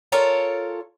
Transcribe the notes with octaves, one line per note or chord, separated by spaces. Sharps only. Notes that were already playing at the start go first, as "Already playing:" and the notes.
F4 A4 A#4 C#5